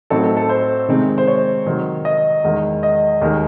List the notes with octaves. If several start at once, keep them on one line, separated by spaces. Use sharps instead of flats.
A2 F#3 C4 D#4 A4
A4
A4
C5
C3 D#3 G#3 C4 D#4
C5
C#5
C3 D#3 F#3
D#5
E2 D#3 G#3
D#5
D#2 D#3 G#3 D#4